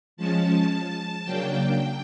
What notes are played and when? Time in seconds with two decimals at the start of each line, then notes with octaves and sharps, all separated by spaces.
0.17 F3 G#3 C#4 A5
1.24 C#3 F#3 A#3 D4 G5